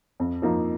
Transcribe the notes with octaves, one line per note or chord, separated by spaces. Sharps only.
F2
F3 A#3 D#4